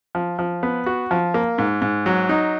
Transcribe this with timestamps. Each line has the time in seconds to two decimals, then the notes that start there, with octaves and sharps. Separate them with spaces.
0.15 F3
0.39 F3
0.63 B3
0.86 F#4
1.11 F3
1.34 A#3
1.58 G#2
1.82 G#2
2.06 F#3
2.29 D#4